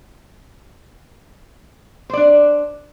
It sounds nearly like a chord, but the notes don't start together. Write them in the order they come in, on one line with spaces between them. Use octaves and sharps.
C5 D5 D4